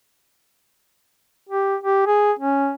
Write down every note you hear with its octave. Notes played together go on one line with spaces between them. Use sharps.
G4
G4
G#4
C#4